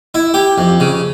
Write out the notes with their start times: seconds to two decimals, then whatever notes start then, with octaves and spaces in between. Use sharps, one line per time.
0.14 E4
0.34 G4
0.58 F2
0.80 C#3